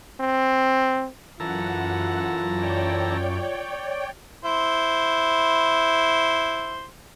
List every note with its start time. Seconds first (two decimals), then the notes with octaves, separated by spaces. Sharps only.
0.20 C4
1.40 F#2 E3 F4 A4 F#5 A#5
2.54 C#5 D5 G5
4.44 E4 C5